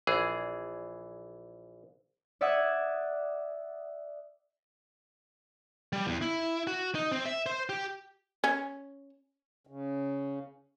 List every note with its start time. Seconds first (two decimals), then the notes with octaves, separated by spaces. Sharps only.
0.07 A#1 E3 G#4
2.41 D5 E5 F#5 D#6 F#6 G#6
5.93 G3
6.08 E2
6.21 E4
6.67 F#4
6.95 D#4
7.12 C4
7.25 E5
7.46 C5
7.69 G4
8.44 C#4
9.67 C#3